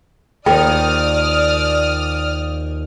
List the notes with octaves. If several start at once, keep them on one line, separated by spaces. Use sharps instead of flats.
D#2 F3 A#4 D5 G5 D#6 F6